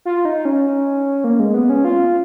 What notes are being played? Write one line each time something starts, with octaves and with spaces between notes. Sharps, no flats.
F4
D#4
C#4
A#3
G#3
B3
C#4
F4